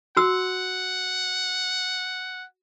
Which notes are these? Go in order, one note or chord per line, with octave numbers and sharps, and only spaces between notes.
F#4 F#5 E6